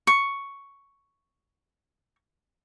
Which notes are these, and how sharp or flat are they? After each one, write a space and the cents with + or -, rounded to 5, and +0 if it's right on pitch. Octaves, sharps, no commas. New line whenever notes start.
C#6 +5